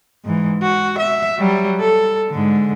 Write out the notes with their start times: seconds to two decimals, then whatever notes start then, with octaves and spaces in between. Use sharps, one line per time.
0.24 G#2 E3
0.62 F#4
0.99 E5
1.38 F#3 G3
1.80 A4
2.30 G#2 D3